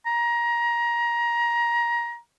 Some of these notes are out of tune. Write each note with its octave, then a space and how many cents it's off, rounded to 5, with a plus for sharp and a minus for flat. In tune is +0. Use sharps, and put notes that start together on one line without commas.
A#5 +20